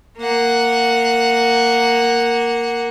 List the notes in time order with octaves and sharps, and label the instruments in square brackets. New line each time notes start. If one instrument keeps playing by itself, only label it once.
[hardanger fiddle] A#3 F#5